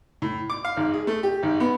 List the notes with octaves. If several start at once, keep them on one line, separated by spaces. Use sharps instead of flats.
A2
D6
F5
G#1
G#4
A3
G4
G#1
B3